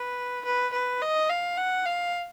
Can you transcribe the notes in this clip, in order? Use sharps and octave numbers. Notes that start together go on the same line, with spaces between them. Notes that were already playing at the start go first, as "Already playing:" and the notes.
Already playing: B4
B4
B4
D#5
F5
F#5
F5